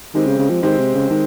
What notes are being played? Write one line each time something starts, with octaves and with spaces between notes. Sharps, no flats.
D#3 G#3 C4 G4 C5
C#3
C#3
F3
D#3 G#3 C4 G4 C5
C3
C#3
D#3 G#3